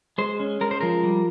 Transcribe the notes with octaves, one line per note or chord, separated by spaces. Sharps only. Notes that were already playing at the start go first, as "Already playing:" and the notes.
G#3 C5
C#4
G#3 A#4
C5
F3 A#4
G3